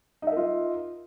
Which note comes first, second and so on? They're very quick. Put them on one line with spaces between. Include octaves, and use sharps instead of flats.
D#4 E5 A#4 F4